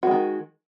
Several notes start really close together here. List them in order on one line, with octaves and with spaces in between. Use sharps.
F#4 G#3 D#3